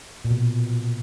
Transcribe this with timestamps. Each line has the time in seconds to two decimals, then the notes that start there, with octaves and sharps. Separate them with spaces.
0.25 A#2
0.31 B2
0.37 A#2